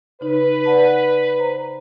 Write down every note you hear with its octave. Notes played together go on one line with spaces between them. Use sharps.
C#3 D#4 B4
D5 F#5 A5
C5 A#5